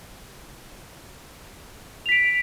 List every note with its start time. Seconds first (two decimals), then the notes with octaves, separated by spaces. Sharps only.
2.06 F7
2.09 B6
2.12 D7